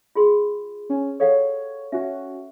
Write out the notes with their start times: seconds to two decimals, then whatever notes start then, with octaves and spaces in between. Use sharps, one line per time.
0.15 F4 G#4 C6
0.90 C#4
1.20 A4 C#5 F5 F#5
1.92 C#4 F#4 E5